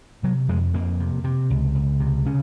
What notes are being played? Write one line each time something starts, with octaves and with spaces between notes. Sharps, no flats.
C3 F#3
F2 G#3
F2 A#3
C3
C3
C#2
C#2
C3
C#3 C#4